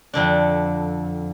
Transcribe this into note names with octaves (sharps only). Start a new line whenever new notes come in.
F2 D3 D4